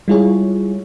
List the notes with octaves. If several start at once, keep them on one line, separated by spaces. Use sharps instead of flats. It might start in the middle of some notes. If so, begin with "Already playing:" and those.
G3 G#3 E4 F4 G#4 C#5